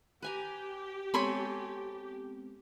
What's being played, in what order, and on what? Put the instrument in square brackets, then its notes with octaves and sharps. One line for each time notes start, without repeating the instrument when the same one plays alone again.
[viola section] G4 [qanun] B4 G#5 A#5
[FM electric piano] G#3 B3 C4 [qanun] A4 G#5 [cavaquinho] C#5 B5 C6